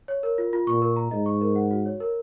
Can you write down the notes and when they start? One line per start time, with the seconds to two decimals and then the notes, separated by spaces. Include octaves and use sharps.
0.08 C#5
0.23 A#4
0.38 F4
0.53 F4
0.67 A#2 C#6
0.82 A#4
0.96 A#5
1.11 G#2 D#5
1.26 C#6
1.41 A#4
1.56 F#5
1.71 F#4
1.86 C#5
2.00 A#4